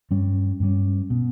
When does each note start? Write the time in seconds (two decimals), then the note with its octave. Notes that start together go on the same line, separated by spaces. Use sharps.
0.11 G2 G3 C#4
0.60 G2 G3 C#4
1.10 B2